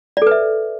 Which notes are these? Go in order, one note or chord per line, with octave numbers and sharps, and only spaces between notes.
A4 B4 D5 E5